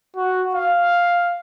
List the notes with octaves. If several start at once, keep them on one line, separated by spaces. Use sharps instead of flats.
F#4
F5